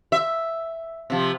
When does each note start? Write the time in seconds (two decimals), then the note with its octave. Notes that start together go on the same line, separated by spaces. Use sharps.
0.12 E5
1.10 C3 F3